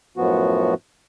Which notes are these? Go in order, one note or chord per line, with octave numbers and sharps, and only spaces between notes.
F#2 A2 F3 B3 F#4